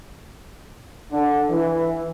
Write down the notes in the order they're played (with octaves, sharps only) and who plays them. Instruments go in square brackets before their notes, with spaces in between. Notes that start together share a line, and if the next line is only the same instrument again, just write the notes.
[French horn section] D3
E3